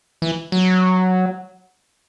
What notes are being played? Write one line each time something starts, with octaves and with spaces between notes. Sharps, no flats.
E3
F#3